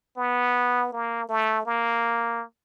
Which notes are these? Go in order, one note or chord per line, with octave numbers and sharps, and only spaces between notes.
B3
A#3
A3
A#3